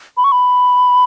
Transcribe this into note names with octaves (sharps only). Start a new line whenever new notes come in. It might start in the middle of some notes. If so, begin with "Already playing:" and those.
B5
C#6
B5